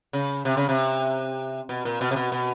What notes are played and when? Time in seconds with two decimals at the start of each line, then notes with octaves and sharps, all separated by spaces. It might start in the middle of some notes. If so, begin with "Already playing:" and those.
0.13 C#3
0.45 C3
0.57 C#3
0.69 C3
1.69 B2
1.85 A#2
2.01 B2
2.11 C3
2.16 B2
2.32 B2